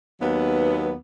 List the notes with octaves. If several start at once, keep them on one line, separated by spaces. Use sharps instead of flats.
D#2 F#3 B3